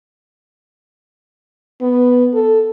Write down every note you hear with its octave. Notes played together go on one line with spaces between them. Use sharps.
B3
A4